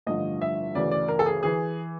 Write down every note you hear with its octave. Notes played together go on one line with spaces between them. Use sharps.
A1 G2 D3 F3 D#5
E5
D2 C#3 E3 D5
D5
A#4
A4
G#4
E3 G#4